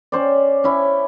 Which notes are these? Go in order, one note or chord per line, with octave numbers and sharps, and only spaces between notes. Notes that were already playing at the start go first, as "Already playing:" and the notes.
C#4 C5 D5
C#4 E4